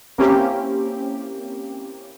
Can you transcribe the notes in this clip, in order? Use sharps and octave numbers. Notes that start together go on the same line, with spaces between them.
A#3 C4 C#4 E4 G4